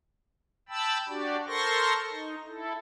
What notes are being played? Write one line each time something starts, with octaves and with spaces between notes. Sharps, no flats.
G5 A5 B5 E6
D4 F#4 G4 D5
A4 A#4 C5 C6 C#6 A#6
D#4
E4 A4